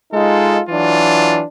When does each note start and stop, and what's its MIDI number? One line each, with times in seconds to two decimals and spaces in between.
0.13 0.59 56
0.13 0.59 63
0.13 0.59 65
0.13 0.59 69
0.69 1.43 52
0.69 1.43 54
0.69 1.43 62
0.69 1.43 65